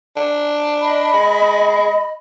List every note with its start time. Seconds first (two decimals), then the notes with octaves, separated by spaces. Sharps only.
0.17 D4
0.81 D#5 B5
1.13 G#3